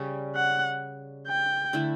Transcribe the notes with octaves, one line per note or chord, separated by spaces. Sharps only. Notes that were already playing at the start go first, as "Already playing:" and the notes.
Already playing: C#3 G3 C#4
F#5
G5
D3 A3 E4